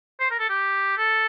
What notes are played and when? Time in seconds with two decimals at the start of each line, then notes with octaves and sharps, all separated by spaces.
0.20 C5
0.31 A#4
0.40 A4
0.49 G4
0.97 A4